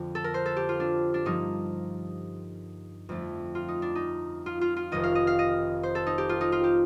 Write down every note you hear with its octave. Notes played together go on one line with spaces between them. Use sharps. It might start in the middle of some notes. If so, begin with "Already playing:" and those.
Already playing: F2 D3
A4
A#4
C5
A4
G4
F4
D4
D4
G2 F3 A#3 D#4
F2 D3 A3
F4
D#4
D4
D#4
F4
F4
F4
F1 F2 D#3 D#5
F5
D#5
F5
D#5
C5
A4
D#4
G4
F4
D#4
F4
G4